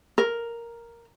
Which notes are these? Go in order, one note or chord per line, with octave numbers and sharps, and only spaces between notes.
A#4